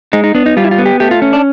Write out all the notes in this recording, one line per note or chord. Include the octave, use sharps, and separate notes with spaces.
G#3 D#4
D#4
B3 D4
D#4
G3 F4
E4
F4
B3
G4
A3 G4
F4
C#4
D4